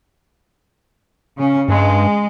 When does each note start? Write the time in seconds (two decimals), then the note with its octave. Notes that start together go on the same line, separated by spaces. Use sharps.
1.37 C#3 C#4
1.69 G2 G#3